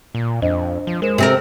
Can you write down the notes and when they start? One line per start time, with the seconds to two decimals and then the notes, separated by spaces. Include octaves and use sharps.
0.15 A#2
0.42 F2 D4 C5 D#5
0.87 F3
1.02 G#3 A#4 C5 E7
1.18 C3 C4 A4 A#4 E5